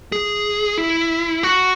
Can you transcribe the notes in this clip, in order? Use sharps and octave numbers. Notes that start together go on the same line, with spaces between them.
G#4
E4
F#4